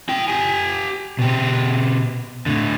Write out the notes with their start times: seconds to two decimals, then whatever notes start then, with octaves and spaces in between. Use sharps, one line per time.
0.09 E4 G5
0.28 G4 G#5
1.19 B2 G4
2.46 A2 D3